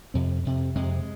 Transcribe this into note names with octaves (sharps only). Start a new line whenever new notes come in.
F2 C3 C4
F2 C3
F2 C3 G#3